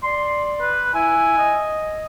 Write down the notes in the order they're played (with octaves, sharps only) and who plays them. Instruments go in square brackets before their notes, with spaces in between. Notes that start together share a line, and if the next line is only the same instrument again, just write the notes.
[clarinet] D5 [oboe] C6
[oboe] B4
[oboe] E4 [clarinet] G#5
[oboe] D#5